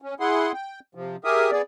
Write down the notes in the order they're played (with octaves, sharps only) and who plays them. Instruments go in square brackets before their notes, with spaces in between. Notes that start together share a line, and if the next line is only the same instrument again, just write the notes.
[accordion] C#4
E4 G#4 F#5 C6
G5
C3 F3
G4 G#4 A#4 E5 D#6
B3 G#4 D5